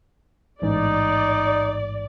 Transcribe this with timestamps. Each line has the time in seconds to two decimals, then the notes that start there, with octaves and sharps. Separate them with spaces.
0.62 A1 G#2 D#4 D5